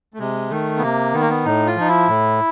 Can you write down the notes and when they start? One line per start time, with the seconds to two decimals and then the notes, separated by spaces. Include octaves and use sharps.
0.14 A3
0.19 C3 G#3
0.50 D#3 A3
0.78 B3
0.82 C3 A#3
1.14 D#3 B3
1.21 A#3
1.29 B3
1.45 A2 D#4
1.67 F4
1.77 F3 D#4
1.88 E4
2.08 A2